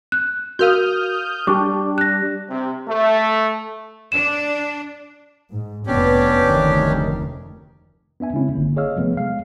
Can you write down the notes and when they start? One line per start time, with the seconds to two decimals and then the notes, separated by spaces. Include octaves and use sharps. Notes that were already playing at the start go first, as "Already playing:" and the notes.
0.12 F#6
0.59 F#4 A#4 F5 D#6 F6 G6
1.47 G3 D4 G4 C#6 D6
1.98 F#6 A#6
2.49 C3
2.88 A3
4.12 D4 E7
5.49 G#2
5.87 F1 B3 C#4 D4 G4
6.43 F1 D2 D#3
8.20 B3 D4 E5 G#5
8.33 C#3 G#3 C4 C#4 E4
8.53 G1 D3 A#3
8.77 G#4 C#5 D#5 F5 E6 F6
8.96 C3 F3 F#3 A3 B3
9.17 G#3 F5